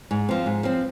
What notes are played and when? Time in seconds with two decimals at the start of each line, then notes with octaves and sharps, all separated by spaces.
0.11 G#2
0.29 F3 C4
0.46 G#2
0.63 F3 C4